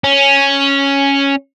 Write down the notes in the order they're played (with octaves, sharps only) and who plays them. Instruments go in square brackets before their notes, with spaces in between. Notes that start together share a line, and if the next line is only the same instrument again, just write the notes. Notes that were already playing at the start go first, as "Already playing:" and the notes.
[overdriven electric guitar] C#4